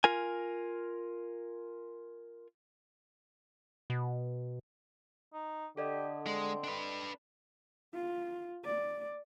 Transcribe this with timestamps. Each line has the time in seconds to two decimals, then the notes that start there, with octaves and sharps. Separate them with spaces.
0.04 F4 A#4 G#5
3.90 B2
5.33 D#4
5.77 D3 G4 A4 D5 D#5
6.26 G#3 C4
6.64 D4 B4
7.94 F4
8.65 D5